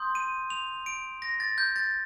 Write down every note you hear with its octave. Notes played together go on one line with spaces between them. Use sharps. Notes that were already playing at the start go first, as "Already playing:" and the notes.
Already playing: C6 D#6 G6
D#7
F7
D7
A#6
A6
G6
A6